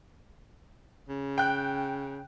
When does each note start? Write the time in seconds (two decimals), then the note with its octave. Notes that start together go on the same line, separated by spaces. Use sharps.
1.09 C#3
1.38 G5 F#6